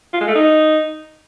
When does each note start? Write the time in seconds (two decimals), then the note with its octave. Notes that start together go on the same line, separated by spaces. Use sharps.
0.13 F4
0.20 G#3
0.28 A3
0.35 D#4